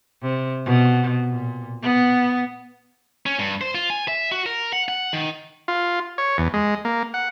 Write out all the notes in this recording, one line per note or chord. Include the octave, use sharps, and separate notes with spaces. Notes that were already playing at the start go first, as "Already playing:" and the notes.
C3
B2
A#2
B3
C#4
G2
C5
F4
G#5
E5
F#4
A#4
F#5
F#5
D#3
F4
C#5
E2
G#3
A#3
F#5